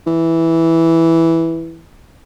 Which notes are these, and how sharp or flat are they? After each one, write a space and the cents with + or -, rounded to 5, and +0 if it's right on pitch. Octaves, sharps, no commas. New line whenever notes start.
E3 -5